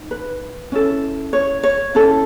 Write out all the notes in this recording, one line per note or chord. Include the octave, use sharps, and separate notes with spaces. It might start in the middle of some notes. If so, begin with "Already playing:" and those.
Already playing: D#4
B4
C#4 E4 A4
C#5
C#5
C#4 E4 A4